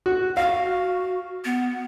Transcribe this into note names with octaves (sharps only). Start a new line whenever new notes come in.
F#4
F#4 F5
B3